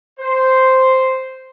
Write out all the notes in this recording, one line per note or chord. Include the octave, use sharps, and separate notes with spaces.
C5